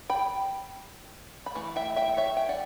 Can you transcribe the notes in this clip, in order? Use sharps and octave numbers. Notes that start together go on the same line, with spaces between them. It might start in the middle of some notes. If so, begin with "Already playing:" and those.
G5 B5
B5
E3 A3
E5 G5
E5 G5
C#5 E5
G5
D5 F#5